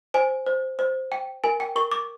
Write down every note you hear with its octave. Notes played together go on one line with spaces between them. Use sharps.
C5 G#5
C5
C5
G5
A#4 G#5
G5
A#4 C#6
D6